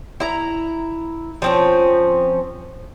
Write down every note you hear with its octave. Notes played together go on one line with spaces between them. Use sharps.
E4 A#5
F3 C4 C#4